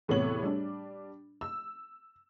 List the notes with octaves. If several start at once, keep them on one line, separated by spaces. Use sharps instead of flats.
E2 A2 C3 B3 C#5 F#7
G3 D4
E6